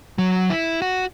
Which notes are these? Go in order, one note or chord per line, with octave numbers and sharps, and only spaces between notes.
F#3
E4
F#4